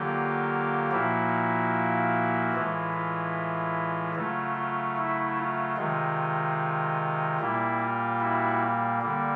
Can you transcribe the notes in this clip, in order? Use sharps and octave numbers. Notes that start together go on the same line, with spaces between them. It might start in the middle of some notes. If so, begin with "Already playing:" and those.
Already playing: D3 F#3 A#3 F4 G4
A#2 F3 A#3 E4 F#4
A2 E3 G#3 F4
F4
C#3 F#3 A3 F4
F4
E4
F4
C3 D#3 G#3 F4
A#2 G3 A#3 E4
F4
E4 F#4
D3 G3 A#3